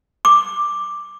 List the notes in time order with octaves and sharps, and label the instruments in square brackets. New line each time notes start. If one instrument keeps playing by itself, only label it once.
[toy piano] D6